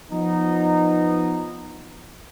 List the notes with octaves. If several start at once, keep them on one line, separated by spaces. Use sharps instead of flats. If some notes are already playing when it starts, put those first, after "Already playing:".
F3 B3 D#4